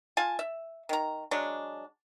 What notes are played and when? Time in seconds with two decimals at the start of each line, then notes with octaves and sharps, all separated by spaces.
0.17 F4 G#5 A5
0.39 E5
0.89 D#3 A#5
1.31 F#3 G#3 D4